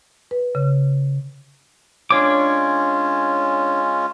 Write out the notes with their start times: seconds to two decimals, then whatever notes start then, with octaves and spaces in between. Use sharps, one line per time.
0.31 B4
0.55 C#3
2.11 G#3 C#4 D4 F4 C#5 D6